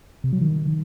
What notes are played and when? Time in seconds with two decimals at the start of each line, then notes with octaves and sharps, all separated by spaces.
0.24 C3
0.33 F#3
0.41 D#3